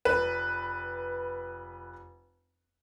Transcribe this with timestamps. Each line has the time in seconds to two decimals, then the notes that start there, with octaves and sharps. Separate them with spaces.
0.05 F1 B4